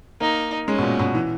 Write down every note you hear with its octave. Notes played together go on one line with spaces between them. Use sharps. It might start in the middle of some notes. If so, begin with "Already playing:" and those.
A#3 D#4
G#3 C#4
B2
A#2
B2
E3